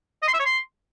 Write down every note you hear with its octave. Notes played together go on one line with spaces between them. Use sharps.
D#5
C6
E5
C#5
C6